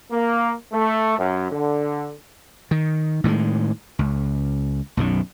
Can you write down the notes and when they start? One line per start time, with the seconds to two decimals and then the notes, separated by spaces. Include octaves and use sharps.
0.11 A#3
0.73 A3
1.19 F#2
1.52 D3
2.71 D#3
3.24 A2 D#3 G3 G#3
3.99 C#2
4.97 B1 F#2 D#3